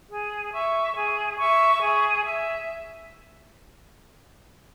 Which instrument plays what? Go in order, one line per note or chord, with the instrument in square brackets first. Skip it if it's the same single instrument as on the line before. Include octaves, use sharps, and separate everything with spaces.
[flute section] G#4
E5 C#6
G#4
E5 C#6
G#4
E5